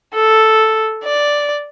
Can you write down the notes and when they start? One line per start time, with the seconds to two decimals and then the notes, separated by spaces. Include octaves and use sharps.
0.14 A4
1.04 D5